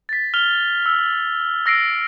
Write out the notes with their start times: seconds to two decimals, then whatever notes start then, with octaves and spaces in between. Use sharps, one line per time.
0.09 A6 B6
0.34 F6 F7 G7
0.86 E6
1.66 E6 A#6 C7 D7